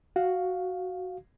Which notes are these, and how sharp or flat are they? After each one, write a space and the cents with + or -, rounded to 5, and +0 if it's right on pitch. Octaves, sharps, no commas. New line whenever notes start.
F#4 +0 F5 +5